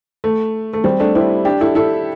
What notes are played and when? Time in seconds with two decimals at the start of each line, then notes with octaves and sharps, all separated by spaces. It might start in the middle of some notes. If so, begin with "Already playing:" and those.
0.24 A3
0.73 A3
0.84 G3 C4
1.00 A3 D4
1.15 C4 E4
1.45 D4 G4
1.61 E4 A4
1.75 E4 A4